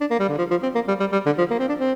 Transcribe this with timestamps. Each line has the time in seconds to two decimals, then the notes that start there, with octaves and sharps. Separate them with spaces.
0.01 D4
0.11 A#3
0.20 G3
0.29 D3
0.38 F3
0.51 F3
0.63 C4
0.75 A#3
0.88 G3
1.00 G3
1.12 G3
1.26 D3
1.38 F3
1.50 A#3
1.59 C4
1.69 D4
1.78 C4